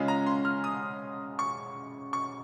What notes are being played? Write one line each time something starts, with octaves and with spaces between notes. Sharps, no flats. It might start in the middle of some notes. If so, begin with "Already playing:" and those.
Already playing: C#3 G#3 C#4 F4
A#5
C6
F6
D#6
C#6
C#6